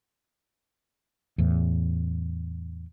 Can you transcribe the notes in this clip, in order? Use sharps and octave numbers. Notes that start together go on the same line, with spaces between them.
E2 A2